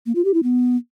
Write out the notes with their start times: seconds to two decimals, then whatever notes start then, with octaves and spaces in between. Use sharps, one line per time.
0.06 A#3
0.15 F4
0.25 G4
0.34 E4
0.43 B3